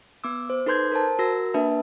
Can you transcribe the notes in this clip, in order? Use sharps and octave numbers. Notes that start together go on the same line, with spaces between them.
B3 D6 E6
C5
D#4 A4 B4 C6 G6 G#6
A#4 C5 A5
F#4 A#4 E6 A#6
A#3 D4 B4 E5 A5